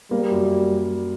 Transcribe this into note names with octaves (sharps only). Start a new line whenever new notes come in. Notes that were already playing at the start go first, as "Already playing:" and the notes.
G3 A#3
F#2